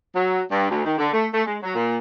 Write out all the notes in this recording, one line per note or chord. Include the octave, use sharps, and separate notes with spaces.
F#3
G2
D2
D#3
D3
A3
A3
G#3
F#3
A#2